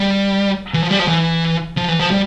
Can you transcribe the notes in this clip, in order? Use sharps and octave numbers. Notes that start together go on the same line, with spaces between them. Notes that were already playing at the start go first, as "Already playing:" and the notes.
Already playing: G3
E3
F3
G3
F3
E3
F3
E3
F3
G3